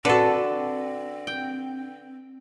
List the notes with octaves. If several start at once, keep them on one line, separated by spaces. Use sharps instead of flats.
D3 C4 D4 F#4 A4 B4
G5